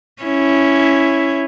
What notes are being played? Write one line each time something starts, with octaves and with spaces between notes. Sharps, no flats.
C#4 E4